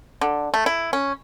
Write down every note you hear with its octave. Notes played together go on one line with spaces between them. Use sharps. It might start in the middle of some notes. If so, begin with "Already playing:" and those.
D3
A3
E4
C#4